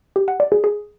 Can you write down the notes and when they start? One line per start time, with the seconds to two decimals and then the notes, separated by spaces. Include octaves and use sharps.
0.16 G4
0.28 F#5
0.40 D5
0.52 G#4
0.64 G#4